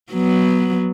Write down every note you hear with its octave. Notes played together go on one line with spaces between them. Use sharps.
F#3 B3